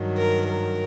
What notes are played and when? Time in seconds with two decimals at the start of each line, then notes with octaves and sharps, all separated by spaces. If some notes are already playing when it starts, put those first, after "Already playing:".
Already playing: G2 D#3 F#3
0.16 A#4
0.47 A#4